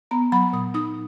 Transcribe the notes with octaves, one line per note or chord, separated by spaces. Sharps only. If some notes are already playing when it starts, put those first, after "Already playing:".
B3 A#5
F#3 B5
A#2 D#6
D#4 D#6